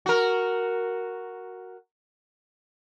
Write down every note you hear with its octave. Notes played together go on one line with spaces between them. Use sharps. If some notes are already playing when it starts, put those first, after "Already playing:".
F#4 A#4